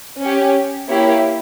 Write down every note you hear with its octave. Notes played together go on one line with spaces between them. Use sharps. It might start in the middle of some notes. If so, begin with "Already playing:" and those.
C#4 G4 C#5
A#3 E4 G4 C#5